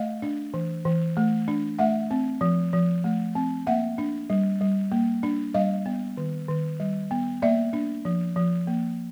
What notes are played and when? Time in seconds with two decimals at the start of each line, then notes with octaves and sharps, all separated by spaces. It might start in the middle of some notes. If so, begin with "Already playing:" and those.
Already playing: A3 D#5 F5
0.22 D4
0.54 E3
0.85 E3
1.17 A3
1.48 D4
1.79 A3 E5 F#5
2.11 C4
2.41 F3
2.73 F3
3.04 A3
3.35 C4
3.67 A#3 E5 F#5
3.98 D4
4.30 G3
4.61 G3
4.92 A#3
5.23 D4
5.54 G3 D#5 F5
5.86 B3
6.17 D#3
6.48 D#3
6.80 G3
7.11 B3
7.42 A#3 D5 E5
7.73 D4
8.05 F3
8.36 F3
8.67 A#3